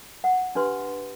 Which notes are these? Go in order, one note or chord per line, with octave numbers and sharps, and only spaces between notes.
F#5
D4 G4 B4 C6